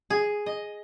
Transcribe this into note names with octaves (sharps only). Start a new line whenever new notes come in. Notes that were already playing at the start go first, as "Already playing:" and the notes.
G#4
D#5